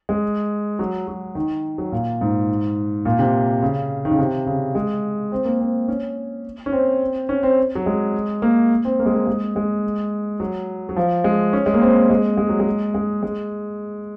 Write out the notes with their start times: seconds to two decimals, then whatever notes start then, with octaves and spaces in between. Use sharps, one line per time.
0.09 G#3
0.79 F#3
1.08 F#3
1.35 D#3
1.78 F#3
1.92 A#2
2.21 G#2
3.05 A#2
3.19 C3
3.62 C#3
4.05 D#3
4.11 C#3
4.18 C3
4.46 C#3
4.75 G#3
5.32 C4
5.45 A#3
5.60 C4
5.88 C#4
6.66 C#4
6.72 C4
7.29 C#4
7.43 C4
7.75 F#3
7.86 G#3
8.42 A#3
8.85 C4
8.99 A#3
9.06 G#3
9.14 A#3
9.27 G#3
9.56 G#3
10.40 F#3
10.89 F#3
10.96 F3
11.24 G#3
11.53 C#4
11.66 G#3
11.74 A#3
11.82 C4
12.10 G#3
12.38 G#3
12.49 F#3
12.60 G#3
12.94 G#3
13.23 G#3